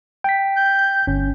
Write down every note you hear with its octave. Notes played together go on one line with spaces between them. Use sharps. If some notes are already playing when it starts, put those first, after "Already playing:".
G5 B6
G6
G1 C#4